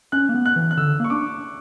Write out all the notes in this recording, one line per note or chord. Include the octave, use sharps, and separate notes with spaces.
C#4 F#6
A#3
B3
F#6
E3
F#6
D3 E6
A#3 C#6
D4 D6